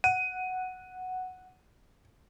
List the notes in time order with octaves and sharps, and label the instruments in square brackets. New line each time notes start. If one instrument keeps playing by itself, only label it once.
[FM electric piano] F#5 [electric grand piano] D#7